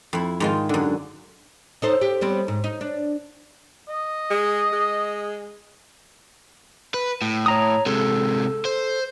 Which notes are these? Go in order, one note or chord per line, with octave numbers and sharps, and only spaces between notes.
F2 E4
G#2 D#3 F4
F#2 D3
D#4 A4 C5
G4
G3 B3 C4
G#2
D#4
D4
D#5
G#3
G#3
B4
A2
C#5 A#5 D#6
C3 G#3 A4
C5